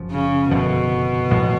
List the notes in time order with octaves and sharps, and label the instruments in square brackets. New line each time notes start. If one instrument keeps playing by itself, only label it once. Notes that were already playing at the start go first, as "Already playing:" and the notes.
Already playing: [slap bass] F#1 F#2 F3
[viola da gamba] C#3
[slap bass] F#1 F2 D3 F3 [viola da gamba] B2
[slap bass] A1 A2 F3 B3